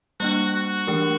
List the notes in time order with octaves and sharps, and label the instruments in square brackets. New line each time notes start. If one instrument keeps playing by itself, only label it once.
[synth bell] G3 A#3 D4 [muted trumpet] F#4
[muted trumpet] F#4
[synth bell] E3 A3 D4 G4 A#4